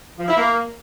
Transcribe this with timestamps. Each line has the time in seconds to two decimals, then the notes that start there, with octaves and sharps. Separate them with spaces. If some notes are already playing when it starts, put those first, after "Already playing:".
0.18 F3
0.27 E4
0.37 A#3